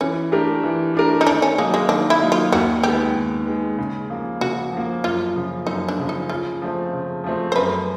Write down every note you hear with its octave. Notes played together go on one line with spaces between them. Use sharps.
E3 C#4
A3 D4 G4 A#4
E3
A3 D4 G4 A#4
D#4
D#3 D4
C#4
F#3 G#3 A#3 D#4
G#3
D#3 D4
E4
F#3 A#3 D#4
F4
D#2 F#4
D#3 G#3 B3 G4
D#2
D#3 G#3 B3
C#3
F3 A#3
C#3 F#4
F3 A#3
F#2 F4
C#3 F3
F#2 D#4
D4
C#3 F3
D#4
C#3 F4
F3 A3 C4
C#3
F3 A3 C4
C5
F#2 B4